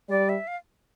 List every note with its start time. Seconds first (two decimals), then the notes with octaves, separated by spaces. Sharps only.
0.09 G3 D5
0.29 E5
0.47 F5